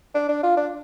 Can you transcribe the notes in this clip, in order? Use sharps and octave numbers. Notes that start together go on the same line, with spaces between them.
D4
D4
F4
D4